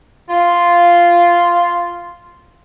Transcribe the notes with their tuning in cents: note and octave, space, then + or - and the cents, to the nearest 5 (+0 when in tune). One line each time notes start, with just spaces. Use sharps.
F4 -5